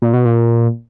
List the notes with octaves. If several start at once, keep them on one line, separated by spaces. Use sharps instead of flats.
A#2
B2
A#2